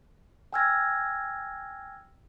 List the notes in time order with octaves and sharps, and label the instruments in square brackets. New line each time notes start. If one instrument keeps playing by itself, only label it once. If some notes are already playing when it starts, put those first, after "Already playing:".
[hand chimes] G5 G#5 E6 F6 G#6 A#6